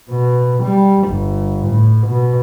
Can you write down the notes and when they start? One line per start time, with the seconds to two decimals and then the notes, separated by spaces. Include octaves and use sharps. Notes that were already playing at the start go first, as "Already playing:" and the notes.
0.10 B2
0.64 G3
1.09 G1
1.68 A2
2.07 B2